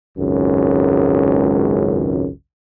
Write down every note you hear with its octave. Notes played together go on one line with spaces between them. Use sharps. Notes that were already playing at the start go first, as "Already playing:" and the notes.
G#1 C#2 F#2